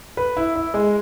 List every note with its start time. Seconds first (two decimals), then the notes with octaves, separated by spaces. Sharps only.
0.17 B4
0.37 E4
0.56 E4
0.74 G#3